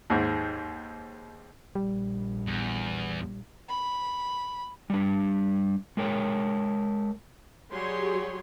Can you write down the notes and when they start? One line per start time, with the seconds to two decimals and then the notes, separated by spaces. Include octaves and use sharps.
0.10 D#2 G#2
1.75 A#1 G3
2.47 E2
3.69 B5
4.90 G3 D4
5.97 G#3 A#4 C#5 G5
7.72 F#3 G3 G4 G#4 C#5 C6